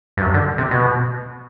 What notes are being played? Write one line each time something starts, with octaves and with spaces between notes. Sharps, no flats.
G2
F#2
D3
C3
B2